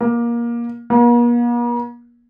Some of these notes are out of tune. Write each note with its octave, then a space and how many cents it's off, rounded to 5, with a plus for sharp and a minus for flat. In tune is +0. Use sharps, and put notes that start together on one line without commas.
A#3 +20
A#3 +45